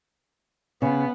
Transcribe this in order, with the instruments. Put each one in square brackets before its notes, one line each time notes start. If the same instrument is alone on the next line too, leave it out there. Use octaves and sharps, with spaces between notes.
[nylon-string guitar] C#3 [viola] B3